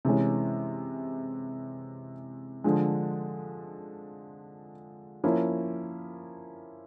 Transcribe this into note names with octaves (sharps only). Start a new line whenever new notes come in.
C3 E3 G#3 C#4
D3 F3 G#3
F3 A#3 C#4 E4